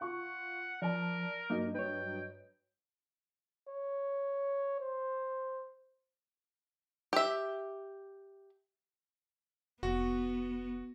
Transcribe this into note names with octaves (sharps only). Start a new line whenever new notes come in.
F4 F#5 C#6
F3 A#4 D5 A5
G2 F#3 A#3 D#4 D#5
B4 C#5 G5
C#5
C5
G4 E5
F1 B3 F#4